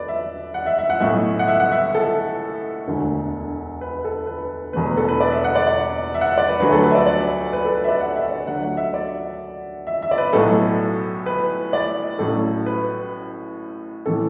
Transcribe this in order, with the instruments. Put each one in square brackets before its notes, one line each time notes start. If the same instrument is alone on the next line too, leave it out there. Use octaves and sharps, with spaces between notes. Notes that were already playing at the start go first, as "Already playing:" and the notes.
Already playing: [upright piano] E1 F#3 A4 B4 D5
E5
F#5
E5
E5
F#5
B1 A2 A3 E5
F#5
E5
F#5
E5
A4
E1 D2 D3 A3
B4
A4
B4
E1 E2 B2 A3 B4
B4
A4
B4
D5
E5
F#5
D5
D5
E5
F#5
E5
D5
B4
D2 D3 F#3 A3 B4
A4
B4
E5
D5
D5
B4
A4
B4
E5
D5
F#5
E5
D5
D2 D3 F#3 A3 F#5
F#5
E5
D5
E5
E5
D5
B4
B1 A2 F#3 A3 A4
B4
D5
A1 A2 F#3 A3 A4
B4
A2 E3 A4